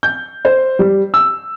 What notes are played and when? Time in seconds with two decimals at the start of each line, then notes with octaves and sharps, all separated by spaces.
0.03 G6
0.45 C5
0.79 G3
1.14 E6